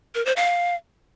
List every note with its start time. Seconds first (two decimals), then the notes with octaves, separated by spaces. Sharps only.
0.15 A#4
0.26 C5
0.36 F5